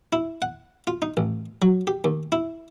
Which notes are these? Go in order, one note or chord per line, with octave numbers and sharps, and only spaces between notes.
E4
F#5
F4
D#4
A1
F#3
G4
D#2
E4